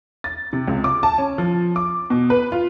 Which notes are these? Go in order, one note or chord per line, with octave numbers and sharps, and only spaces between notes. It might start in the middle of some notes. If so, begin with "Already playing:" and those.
A6
C3
C#2
D6
A5
C#4
F3
D6
B2
B4
F4